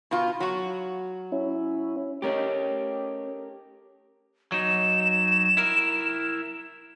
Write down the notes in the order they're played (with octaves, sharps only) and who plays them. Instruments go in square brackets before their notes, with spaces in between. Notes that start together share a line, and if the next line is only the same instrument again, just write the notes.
[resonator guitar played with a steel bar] B2 F4
F#3 F#4
[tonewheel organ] C#4 E4
[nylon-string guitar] A3 C#4 D#5 [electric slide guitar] G4 A#4
[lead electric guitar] F#3 D#4 [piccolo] E7
[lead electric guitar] E4 A#4